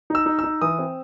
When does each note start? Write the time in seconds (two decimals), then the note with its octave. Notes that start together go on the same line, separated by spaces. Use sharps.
0.10 D#4 E6
0.26 D#4
0.39 D#4 E6
0.61 E3 D#6
0.79 C4